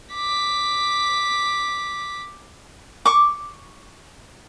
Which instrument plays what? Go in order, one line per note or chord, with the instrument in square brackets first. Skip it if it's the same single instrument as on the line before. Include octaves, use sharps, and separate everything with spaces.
[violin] D6 B6
[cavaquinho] C#6 D6